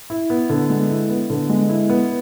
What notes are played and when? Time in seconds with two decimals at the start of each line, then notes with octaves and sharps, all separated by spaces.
0.10 E4
0.30 B3
0.50 D3
0.70 G#3
0.90 E4
1.09 B3
1.30 D3
1.49 G#3
1.69 E4
1.90 B3